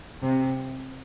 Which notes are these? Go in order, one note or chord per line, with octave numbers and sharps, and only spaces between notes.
C3